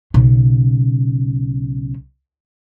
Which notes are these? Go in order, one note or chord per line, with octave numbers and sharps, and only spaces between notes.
B1 C#3